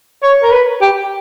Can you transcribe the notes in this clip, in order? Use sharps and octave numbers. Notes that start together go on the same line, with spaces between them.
C#5
A#4
B4
G4